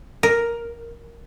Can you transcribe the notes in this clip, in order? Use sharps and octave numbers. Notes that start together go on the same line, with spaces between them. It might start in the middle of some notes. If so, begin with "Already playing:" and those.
A#4